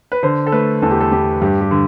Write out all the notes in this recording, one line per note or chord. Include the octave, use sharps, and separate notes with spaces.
B4
D3 C5
A4
A3 B4
E2 A4
G4
A4
E2 G4
G2 G4
G4
D3